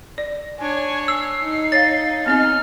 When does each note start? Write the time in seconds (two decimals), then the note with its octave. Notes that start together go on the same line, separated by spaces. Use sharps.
0.18 D5
0.59 D4 C#5 G#5
1.08 E6 C7
1.43 D#4
1.72 C#5 F5 A6
2.26 B3 C4 D#4 D#5 F6